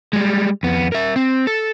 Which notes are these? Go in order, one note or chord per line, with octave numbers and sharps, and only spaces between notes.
G3 G#3
F2 B3
A#4 E5
C4
A4